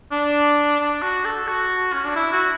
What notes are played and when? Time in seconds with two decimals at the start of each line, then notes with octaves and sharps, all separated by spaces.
0.12 D4
0.80 D4
1.02 F#4
1.25 A4
1.47 F#4
1.93 C#4
2.05 D4
2.16 E4
2.32 F#4